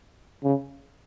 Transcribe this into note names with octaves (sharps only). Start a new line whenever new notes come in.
C#3